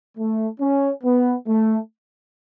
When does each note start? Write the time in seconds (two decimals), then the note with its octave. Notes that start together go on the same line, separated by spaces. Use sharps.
0.18 A3
0.60 C#4
1.04 B3
1.47 A3